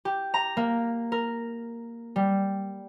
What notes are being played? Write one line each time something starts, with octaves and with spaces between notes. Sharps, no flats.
G4
A#5
A#3
A#4
G3